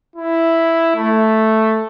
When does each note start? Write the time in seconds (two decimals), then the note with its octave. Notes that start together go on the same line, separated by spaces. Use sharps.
0.16 E4
0.96 A3